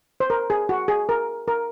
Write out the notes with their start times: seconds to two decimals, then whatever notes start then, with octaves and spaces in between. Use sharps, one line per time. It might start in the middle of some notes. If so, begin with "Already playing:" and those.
0.20 C5
0.30 A#4
0.50 G#4
0.69 F#4
0.88 G#4
1.09 A#4
1.48 A#4